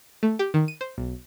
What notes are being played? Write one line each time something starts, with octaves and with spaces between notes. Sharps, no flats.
A3
G4
D#3
D#7
C5
B1